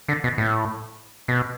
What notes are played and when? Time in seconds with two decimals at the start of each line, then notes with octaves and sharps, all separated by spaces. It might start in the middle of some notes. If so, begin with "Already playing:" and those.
0.08 D3
0.24 B2
0.38 A2
1.28 B2